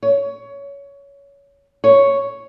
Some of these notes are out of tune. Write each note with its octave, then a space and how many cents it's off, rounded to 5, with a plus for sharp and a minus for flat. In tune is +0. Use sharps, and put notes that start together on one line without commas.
C#5 +20
C#5 +0